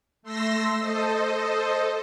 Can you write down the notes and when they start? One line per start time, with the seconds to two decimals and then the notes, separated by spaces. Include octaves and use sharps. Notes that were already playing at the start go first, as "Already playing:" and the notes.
0.23 A3 C6 E6 A#6
0.79 A4 C5 D#5